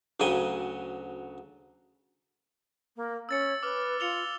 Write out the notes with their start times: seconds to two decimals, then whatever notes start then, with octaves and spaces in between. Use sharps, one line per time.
0.20 D2 C#3 F#3 G5 G#5
2.96 A#3
3.29 C#4 E6 A6 C#7
3.63 B4 D6 F6
4.00 F4 C#7 F7 G7